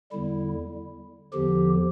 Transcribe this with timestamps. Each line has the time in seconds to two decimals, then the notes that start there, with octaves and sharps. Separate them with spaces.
0.12 E2 D3 G3 E4
1.33 E2 D3 F3 G4